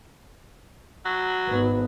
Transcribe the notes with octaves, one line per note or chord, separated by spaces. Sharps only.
F#3
G#1 B3